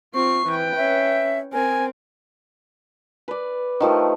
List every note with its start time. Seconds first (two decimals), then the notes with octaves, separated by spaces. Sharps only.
0.14 C4 F4 C#6 C7
0.47 E3 B4 G5
0.77 C#4 E5
1.53 C4 A#4 G#5
3.28 B4 D5
3.80 D#3 F3 A3 G4